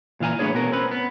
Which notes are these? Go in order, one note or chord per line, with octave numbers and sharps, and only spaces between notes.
A#2 E3 F5 G#5 A#5
A3 B3 D4 G#4 C#5
B2 B3 A#4
C4 C#4 B4
B3